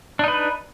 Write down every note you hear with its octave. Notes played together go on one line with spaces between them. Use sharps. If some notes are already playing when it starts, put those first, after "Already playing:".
D4 D#4 B4